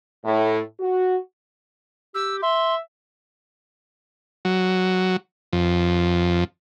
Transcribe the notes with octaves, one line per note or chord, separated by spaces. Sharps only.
A2
F#4
G4 E6
E5 C6
F#3
F2